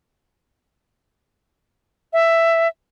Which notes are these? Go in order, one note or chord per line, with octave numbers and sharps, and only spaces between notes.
E5